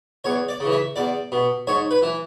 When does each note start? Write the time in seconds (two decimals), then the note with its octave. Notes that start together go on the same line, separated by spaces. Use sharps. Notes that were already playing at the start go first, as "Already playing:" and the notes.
0.24 E2 C#5
0.49 D5
0.60 C#3 E3
0.72 E5
0.96 E2 D5
1.32 B2
1.67 G#2 C#5
1.91 B4
2.02 E3